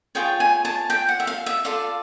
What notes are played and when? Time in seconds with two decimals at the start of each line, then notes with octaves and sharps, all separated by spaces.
0.15 F4 G#4 C#5 G5
0.40 G#5
0.65 A5
0.90 G5
1.08 F#5
1.20 E5
1.27 F5
1.46 E5
1.65 F4 A4 D5 F5